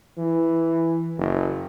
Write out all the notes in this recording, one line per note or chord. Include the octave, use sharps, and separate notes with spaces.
E3
F#1